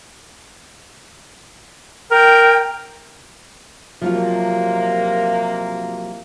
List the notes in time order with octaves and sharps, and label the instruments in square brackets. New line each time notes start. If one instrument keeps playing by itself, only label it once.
[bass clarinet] A#4 [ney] G5
[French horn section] C3 A#3 [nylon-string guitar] F3 F#3 F4